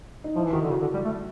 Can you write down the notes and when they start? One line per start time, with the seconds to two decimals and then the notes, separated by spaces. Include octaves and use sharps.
0.24 D#4
0.36 F3 E4
0.44 E3
0.53 D#3 F#4
0.61 D3
0.70 C#3
0.82 D3
0.94 G3
1.05 A3